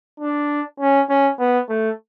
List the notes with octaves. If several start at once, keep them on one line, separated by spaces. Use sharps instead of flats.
D4
C#4
C#4
B3
A3